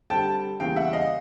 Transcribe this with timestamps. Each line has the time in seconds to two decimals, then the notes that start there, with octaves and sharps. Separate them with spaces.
0.10 D3 G3 C4 G5 A5
0.60 E2 C#3 E3 G3 A#3 F5 G5
0.76 E5 F#5
0.93 D#5 F5